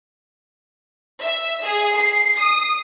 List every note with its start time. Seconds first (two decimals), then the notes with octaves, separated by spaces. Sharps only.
1.23 E5
1.64 G#4
1.98 C7
2.40 D#6